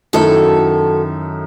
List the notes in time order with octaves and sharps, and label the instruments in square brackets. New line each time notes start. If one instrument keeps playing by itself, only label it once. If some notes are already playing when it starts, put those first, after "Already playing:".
[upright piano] F#2 D#3 A3 E4 [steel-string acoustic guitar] F#4 A4